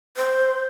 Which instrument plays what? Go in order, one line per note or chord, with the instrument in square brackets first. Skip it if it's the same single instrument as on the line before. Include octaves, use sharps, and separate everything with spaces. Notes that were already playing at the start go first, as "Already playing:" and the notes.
[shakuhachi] C5